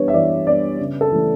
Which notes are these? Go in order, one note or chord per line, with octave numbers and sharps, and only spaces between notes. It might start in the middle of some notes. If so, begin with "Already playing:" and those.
Already playing: E3 G3 B3 D4 B4 C#5
E5
E3 D5
G3 B3 D4 D5
C#3
A4
E3 A3 C#4